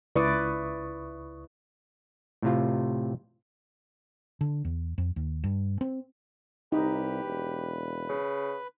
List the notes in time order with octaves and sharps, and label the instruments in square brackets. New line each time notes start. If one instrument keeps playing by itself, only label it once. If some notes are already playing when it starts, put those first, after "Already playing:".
[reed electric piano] C#2 C#6 D#6 [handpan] E4 B4 D5
[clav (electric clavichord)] A2 C3 F4
[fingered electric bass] D3
E2
F2
D#2
G2
C4
[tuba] C2 [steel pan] D#4 [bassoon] G4 [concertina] B4
[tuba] E1
[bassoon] C#3